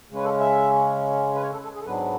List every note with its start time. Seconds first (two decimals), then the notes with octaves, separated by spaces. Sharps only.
0.10 C#3 G#3 C#4 B4
0.24 A4
0.39 E5
1.34 B4
1.42 C#5
1.52 A4
1.64 A4
1.75 G#4
1.81 A4
1.86 G#2 F#3 B3 D4 B4